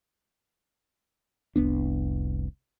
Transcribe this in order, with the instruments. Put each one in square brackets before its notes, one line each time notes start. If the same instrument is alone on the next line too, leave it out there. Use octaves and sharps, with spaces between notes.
[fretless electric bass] F1 C2 B3 D4